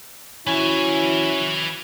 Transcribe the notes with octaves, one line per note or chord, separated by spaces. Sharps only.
C#4 E4 F#4 B4 G#5